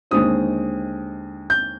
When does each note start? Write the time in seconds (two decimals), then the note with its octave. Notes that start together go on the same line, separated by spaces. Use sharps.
0.11 D#2 D3 G#3 C4 D#6
1.50 G6